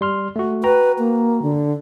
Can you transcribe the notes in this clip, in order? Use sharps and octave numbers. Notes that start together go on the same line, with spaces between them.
G3 C6 F6
A3 F#4
F#4 B4 G5 A#5
A#3
D3